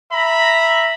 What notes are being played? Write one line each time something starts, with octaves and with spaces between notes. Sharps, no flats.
E5 A#5 B5